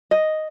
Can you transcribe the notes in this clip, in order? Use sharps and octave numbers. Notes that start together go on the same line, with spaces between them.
D#5